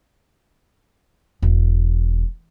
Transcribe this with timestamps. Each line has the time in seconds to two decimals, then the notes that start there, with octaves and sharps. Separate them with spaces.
1.42 E1